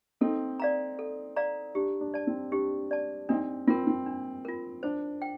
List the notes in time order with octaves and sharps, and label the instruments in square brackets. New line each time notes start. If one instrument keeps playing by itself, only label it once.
[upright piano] C4 D#4 [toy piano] A4
[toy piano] D5 F5 A#5
A4
D5 F5 A#5
[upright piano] D4 [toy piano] G4
[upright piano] D4
[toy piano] D5 A5
[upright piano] C4
[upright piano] D4 [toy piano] G4
[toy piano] D5 A5
[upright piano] C4 D#4 [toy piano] D4
[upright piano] C4 [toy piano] F4 A#4
[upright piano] C4
[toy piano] D4
F4 A#4
[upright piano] D4 [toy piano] C5
[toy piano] G5